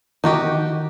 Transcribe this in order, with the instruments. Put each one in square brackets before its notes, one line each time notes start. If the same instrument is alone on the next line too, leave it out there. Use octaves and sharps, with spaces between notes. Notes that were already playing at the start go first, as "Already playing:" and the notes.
[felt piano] D#3 [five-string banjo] D#4 F#4 G4